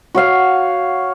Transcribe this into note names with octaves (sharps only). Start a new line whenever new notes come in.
F#4 C#5 F5